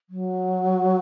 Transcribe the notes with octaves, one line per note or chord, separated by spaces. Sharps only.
F#3